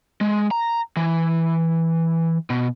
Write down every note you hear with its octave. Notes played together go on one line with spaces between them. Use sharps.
G#3
A#5
E3
B2